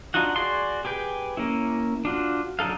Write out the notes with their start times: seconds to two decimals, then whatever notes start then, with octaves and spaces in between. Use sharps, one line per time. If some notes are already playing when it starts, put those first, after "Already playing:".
0.14 D4 D#4 F4 F#4 F#5
0.36 F#4 G#4 D5 C6
0.85 G4 G#4 B4 G5
1.37 A#3 C#4 E4
2.05 D4 F4 F#4
2.59 D3 F#3 D#4 A4 F5